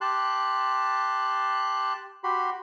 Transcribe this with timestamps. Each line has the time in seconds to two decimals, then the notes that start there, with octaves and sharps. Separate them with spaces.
0.01 G4 A5 C6 F#6
2.24 F#4 G4 B5 C6